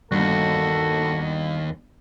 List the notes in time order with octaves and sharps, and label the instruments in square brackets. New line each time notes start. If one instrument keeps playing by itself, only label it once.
[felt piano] G1 [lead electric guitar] D#2 [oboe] F#4 [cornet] A4